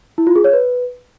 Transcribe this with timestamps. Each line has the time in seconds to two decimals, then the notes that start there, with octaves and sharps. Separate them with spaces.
0.18 E4
0.27 F4
0.36 G#4
0.44 C#5
0.53 B4